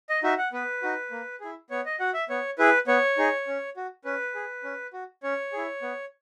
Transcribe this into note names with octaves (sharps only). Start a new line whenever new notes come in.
D#5
D#4 F#4 E5
F#5
B3 B4
D#4 F#4
A#3
E4 G#4
B3 C#5
D#5
F#4 F#5
E5
B3 C#5
E4 G#4 B4
B3 C#5
D#4 G#4
C#4
F#4
C#4 B4
G#4
C#4
F#4
C#4 C#5
E4 G#4
B3